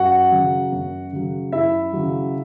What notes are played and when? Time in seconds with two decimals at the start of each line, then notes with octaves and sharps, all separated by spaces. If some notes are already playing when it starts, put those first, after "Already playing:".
Already playing: F#2 F#4 F#5
0.32 C#3 F#3
0.72 F#2
1.12 C#3 F#3
1.52 F#2 E4 E5
1.93 C#3 F#3